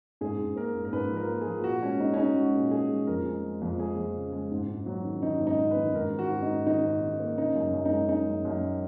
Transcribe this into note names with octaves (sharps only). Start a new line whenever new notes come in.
G#2 G#4
G#2
A#3 A#4
G#2
A#4
G#2 B4
F3
A#4
A#3
G#4
F3
A#2 F#4
G#3 C#4
G#3 D#4
C#4
G#3 D#4
G#3 F#4
A#2
G#3 G#4
G#3
F2 A#4
G#3
G#3
F2
G#3 G#4
F2
C#3
G#3
G#2
G#2
F#3
D#3
D#3 D#4
G#2
D#4
G#2
B4
D#3
G#2 A#4
D#3
F#4
G#2
D#4
G#2
D#3 D#4
G#2
D#3
A#3
C#3 D#4
F#2
F#2
D#4
G#3
G#3 D#4
F#2
F#2